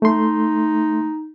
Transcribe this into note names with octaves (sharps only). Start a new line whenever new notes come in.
A3 D#4 C6